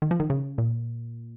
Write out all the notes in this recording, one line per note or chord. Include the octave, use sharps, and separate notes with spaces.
D#3
F3
D#3
C#3
A#2